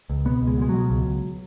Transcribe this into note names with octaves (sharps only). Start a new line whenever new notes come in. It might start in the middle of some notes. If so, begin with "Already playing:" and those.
C#2
B2 B3
C#2
G#3
B2 G#3
B2 F#3
C#2
C#2